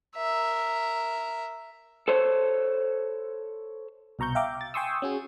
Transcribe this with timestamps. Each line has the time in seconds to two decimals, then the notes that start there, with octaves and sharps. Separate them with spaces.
0.16 A#4 E5
2.08 A4 C5 C#5
4.19 C2 B2 A#5 C#6 G6
4.35 E5 F5 G5 A#5 D6
4.61 A6
4.74 G5 G#5 C6 C#6 D#6 E6
5.02 C#4 F#4 G#4